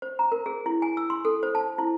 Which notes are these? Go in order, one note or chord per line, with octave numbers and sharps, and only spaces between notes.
C5
A#5
A#4
G#4
E4
G#5
E6
C6
A4
C5
A5
E4